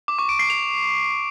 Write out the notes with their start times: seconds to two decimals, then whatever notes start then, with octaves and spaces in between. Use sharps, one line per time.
0.08 D6
0.19 C#6
0.29 D7
0.39 C7
0.50 F7